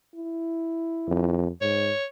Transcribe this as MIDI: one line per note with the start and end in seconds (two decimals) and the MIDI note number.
0.15 1.42 64
1.08 1.50 41
1.61 1.92 44
1.61 2.05 73